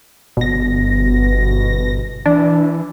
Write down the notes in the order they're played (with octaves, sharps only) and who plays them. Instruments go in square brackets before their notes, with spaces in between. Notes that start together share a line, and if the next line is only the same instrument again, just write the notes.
[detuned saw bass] G1 [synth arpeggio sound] B2 A#6
[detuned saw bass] E3 [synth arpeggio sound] D4